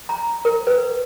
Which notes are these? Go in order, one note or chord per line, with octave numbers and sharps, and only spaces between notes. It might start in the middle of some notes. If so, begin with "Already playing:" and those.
A#5
A#4
B4